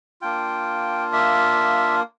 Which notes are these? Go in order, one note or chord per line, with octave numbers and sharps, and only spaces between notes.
A#3 D4 F4 G5
E5